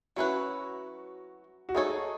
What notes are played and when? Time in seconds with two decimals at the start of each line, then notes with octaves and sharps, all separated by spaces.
0.16 F#3 C#4 E4 F#4 B4
1.69 F#4
1.75 A3 D#4 G#4 A4 C#5